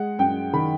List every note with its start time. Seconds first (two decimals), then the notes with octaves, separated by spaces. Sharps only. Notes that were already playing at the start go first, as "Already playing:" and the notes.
Already playing: G#3 F#5
0.18 F#2 G5
0.53 D#3 B5